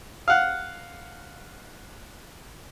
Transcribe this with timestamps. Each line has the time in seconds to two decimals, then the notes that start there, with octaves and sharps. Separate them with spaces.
0.28 F5 F#5